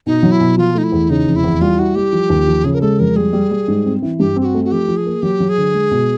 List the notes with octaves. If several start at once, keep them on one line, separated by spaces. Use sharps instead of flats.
B2 D#4
F#3
E4
B2
F3 F4
A3 D#4
E4
E2
C#3 D#4
F1
E4
E2
G3 F4
E4 F#4
G3 G4
F3
D#2
F3
C#3 G#4
A#4
G#3 A4
F2 A#4
G3 G#4
G3
G3
G#2
C4
E3
G2 G4
C4 G4
F#4
A3
F#4
F3 G4
F3
G#4
A#3
F#3 G4
F#3
G#4
D3
G#3
B2